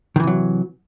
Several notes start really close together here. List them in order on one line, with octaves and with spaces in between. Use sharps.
D#3 E3 C3 F#3